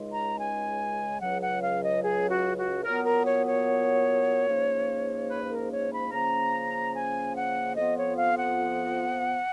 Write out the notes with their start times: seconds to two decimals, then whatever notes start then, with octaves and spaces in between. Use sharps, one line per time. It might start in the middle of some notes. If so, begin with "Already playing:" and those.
Already playing: C#2 C#3 G#3 D#4
0.11 A#5
0.38 G#5
1.20 C#2 C#3 F#3 F#5
1.41 F#5
1.61 F5
1.82 D#5
2.02 G#4
2.29 F#4
2.57 F#4
2.84 A#2 F#3 B3 A#4
3.04 A#4
3.25 C#5
3.46 C#5
4.48 G#2 F3 A#3 C#4
5.30 B4
5.50 A#4
5.71 C#5
5.92 B5
6.11 C#3 F3 A#3 C#4 A#5
6.94 G#5
7.35 F#5
7.75 F2 F3 B3 F4 D#5
7.97 C#5
8.16 F5
8.37 F#5